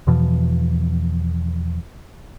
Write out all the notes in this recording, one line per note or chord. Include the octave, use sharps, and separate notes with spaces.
E2 B2 E3 F3